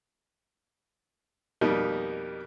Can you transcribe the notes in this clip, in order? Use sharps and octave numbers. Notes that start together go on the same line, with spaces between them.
F2 B2 G3 A#3 D#4